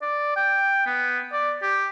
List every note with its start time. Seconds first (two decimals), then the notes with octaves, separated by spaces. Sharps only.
0.02 D5
0.36 G5
0.86 B3
1.32 D5
1.63 G4